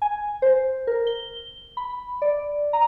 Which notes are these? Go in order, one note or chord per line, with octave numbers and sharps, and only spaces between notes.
G#5
C5
A#4
G7
B5
D5
A#5